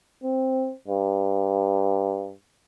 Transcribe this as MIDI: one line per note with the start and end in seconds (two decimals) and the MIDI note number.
0.24 0.73 60
0.88 2.33 43